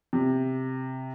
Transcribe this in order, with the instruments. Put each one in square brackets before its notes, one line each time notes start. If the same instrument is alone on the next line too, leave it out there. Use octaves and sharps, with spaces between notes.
[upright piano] C3